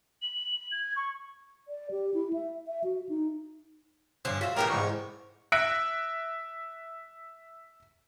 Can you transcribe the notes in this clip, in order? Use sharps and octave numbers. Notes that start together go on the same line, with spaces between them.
F#7
G#6
C#6
D5
G4
E4
E5
E5
F#4
D#4
G2 D3 F3 C#4 C5
F4 F#4 E5
A2 C#3 E3 C#4 G4 A#4
E2 G#2 C3 C#6
E5 F#6 A#6 D7